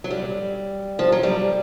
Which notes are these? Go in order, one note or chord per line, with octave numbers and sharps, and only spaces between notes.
F#3
G3
F3
F#3
G3